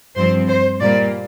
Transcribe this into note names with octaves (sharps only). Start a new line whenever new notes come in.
G2 F3 C4 C5
C5
A#2 G3 A#3 D5